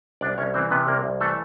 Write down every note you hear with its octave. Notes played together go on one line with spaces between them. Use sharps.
C2 D4 D5
C2 C#4 C#5
E3 C4 C5
C3 B3 B4
C2 A#3 A#4
C2
E3 A3 A4